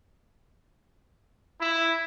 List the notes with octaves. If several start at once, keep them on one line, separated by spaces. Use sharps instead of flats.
E4